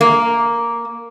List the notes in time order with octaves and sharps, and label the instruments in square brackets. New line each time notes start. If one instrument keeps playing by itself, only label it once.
[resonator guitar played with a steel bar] A#3